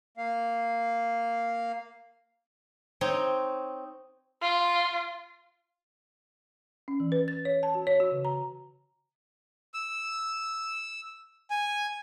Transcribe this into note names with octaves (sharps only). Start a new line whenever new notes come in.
A#3 F5
C4 D#4 C#5
F4
C#4
E3
B4
A6
C#5
A5
F#4
C#5
F#4
C#3
A#5
E6
G#5